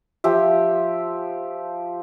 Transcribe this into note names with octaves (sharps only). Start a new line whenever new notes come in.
F3 G4 E5